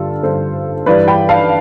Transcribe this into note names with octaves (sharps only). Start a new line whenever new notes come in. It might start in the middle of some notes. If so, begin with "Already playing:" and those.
Already playing: G2 D3 G3 F4 A4
G2 D3 G3 A4 C5
G2 E3 G3 B4 D5
G5 B5
F5 A5